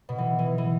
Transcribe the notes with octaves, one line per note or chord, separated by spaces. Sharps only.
B2
E3
E3
E3